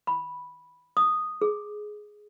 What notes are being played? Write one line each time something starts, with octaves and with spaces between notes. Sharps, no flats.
B5
D#6
G#4